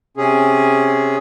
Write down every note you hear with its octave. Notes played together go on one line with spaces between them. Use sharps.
C3 C#4 G#4